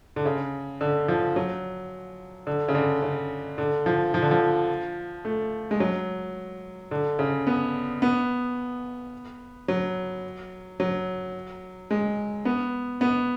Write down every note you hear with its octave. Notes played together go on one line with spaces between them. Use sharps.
D3
C#3
D3
F3
F#3
D3
C#3
D3
C#3
D3
F3
F3
D3
F3
A3
G#3
F#3
D3
C#3
B3
B3
F#3
F#3
G#3
B3
B3